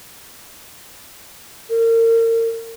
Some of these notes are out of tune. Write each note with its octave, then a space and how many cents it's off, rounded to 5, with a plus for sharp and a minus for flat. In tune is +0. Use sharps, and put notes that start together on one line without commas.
A#4 -35